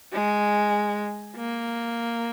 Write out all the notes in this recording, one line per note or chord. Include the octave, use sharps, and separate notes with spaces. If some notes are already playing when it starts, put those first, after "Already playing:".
G#3
A#3